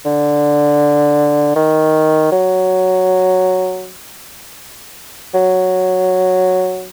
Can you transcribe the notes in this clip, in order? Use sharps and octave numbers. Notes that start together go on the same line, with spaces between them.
D3
D#3
F#3
F#3